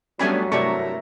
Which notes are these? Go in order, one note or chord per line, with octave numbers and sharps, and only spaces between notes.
F#3 G3 A3 B3 C#4 D4 G#5 B5
G2 C3 A3 E4 A#4 D5 A5 C#6